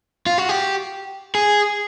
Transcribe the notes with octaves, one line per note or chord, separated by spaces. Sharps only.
F4
F#4
G4
G#4